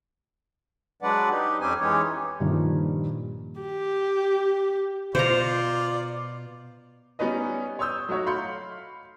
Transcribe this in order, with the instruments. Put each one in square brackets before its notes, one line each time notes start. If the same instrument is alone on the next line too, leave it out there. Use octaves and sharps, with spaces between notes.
[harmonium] F#3 G#3 D4 B4 D5 F#5
D#4 G4
F2 C4 C#4 G4 C5 G#5
E3 G#3 C#4 D#4 G4 C#5
[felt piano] G2 A#2 D#3 F3
[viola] G4
[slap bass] B2 [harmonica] F4 D5 [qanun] C5 A#5
[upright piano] G3 B3 C#4 D#4 B4 D#5
C#5 C6 D#6 E6 G6
F#3 A3 D#4 F#4 C#5
F5 B5 C6 G6 C#7